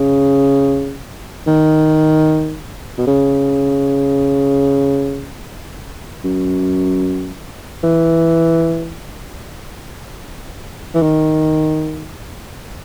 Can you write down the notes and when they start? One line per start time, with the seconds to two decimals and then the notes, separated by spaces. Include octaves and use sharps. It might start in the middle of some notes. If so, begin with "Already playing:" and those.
Already playing: C#3
1.47 D#3
2.98 B2
3.07 C#3
6.24 F#2
7.84 E3
10.95 E3
11.02 D#3